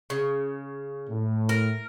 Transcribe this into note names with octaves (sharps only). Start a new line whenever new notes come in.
C#3
A2
A#4